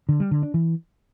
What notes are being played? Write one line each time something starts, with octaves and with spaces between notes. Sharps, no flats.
D3
G3
D3
D4
E3